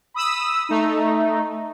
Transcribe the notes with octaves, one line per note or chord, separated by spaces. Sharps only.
B5 D#6 E6
A3 D#4